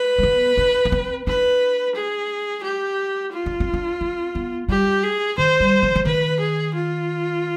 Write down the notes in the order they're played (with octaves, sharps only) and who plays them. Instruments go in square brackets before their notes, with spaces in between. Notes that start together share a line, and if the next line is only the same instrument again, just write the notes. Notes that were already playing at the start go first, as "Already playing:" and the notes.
Already playing: [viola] B4
[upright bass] G#3
B3
D4
D4
C4
[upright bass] D4 [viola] B4
[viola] G#4
G4
F4
[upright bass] D4
C4
D4
C4
B3
[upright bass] G3 [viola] G4
[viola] G#4
[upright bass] D#3 [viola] C5
[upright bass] G3
F3
F3
[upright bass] D#3 [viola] B4
[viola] G#4
F4